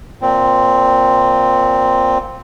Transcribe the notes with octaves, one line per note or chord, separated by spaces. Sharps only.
A#2 C4